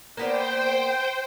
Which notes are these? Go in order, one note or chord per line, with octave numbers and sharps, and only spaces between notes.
A#3 B3 C5 D5 G5